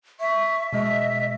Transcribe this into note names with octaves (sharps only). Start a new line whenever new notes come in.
E5 C#6
B2 G#3 D#5 E5